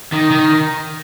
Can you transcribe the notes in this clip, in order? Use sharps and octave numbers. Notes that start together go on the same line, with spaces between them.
D#3
D#3